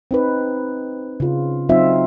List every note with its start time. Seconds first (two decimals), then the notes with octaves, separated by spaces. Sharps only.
0.11 C4 D#4 B4
1.20 C#3 F4
1.69 F#3 C4 D#4 F4 E5